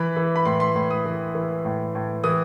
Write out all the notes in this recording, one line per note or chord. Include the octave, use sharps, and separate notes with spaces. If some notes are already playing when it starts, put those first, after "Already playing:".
Already playing: E3 B5
E3
B5
A2 C6
C6
A2 C6
D#6
E3
E3
A2
A2
E3 D#6